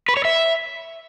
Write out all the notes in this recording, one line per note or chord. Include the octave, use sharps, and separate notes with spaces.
B4
C#5
E5